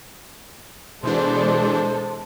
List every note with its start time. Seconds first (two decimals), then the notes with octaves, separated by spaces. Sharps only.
1.03 B2 E3 G#3 D4 A4 C5